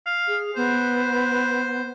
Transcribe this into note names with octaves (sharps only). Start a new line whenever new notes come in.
F5
G#4
B3 C5